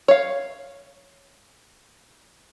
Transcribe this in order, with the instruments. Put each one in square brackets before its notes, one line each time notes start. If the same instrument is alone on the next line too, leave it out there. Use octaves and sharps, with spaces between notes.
[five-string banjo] C#5 F5